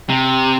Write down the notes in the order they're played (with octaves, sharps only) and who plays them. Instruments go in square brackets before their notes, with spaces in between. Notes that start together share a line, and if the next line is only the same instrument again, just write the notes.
[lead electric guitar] C3